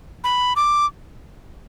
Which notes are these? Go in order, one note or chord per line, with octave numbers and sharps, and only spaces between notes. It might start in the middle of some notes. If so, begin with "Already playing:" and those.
B5
D6